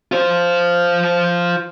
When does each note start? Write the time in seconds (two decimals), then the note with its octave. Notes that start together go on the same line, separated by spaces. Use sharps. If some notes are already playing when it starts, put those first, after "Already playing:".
0.12 F4 C5